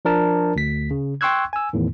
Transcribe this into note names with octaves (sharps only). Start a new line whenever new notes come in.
F3 D4 A#4 A5
D2 B6
C#3
G5 C6 C#6 E6 F#6 G#6
G#5 E6
E2 A2 D#3